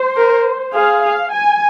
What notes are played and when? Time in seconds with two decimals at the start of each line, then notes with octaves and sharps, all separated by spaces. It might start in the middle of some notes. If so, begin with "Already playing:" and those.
Already playing: C5
0.16 A#4
0.74 G#4 F5
1.03 F5
1.32 G#5